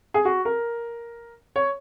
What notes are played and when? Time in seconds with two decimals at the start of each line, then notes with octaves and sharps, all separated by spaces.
0.14 G#4
0.25 F#4
0.45 A#4
1.56 C#5